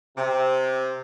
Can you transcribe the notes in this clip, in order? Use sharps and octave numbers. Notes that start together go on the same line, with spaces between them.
C3